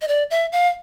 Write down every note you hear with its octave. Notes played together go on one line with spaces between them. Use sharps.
D#5
D5
E5
F5